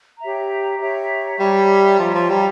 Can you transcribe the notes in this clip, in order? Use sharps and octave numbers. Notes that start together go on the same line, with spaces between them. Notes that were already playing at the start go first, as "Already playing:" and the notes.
G4 C#5 E5 A#5
G4 C#5 E5 A#5
G3 G4 C#5 E5 A#5
F3 G4 C#5 E5 A#5
F3
G3